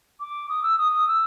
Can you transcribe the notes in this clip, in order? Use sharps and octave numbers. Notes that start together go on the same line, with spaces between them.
D6
D#6
E6
D#6
D#6
E6